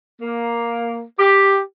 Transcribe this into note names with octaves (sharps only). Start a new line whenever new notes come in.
A#3
G4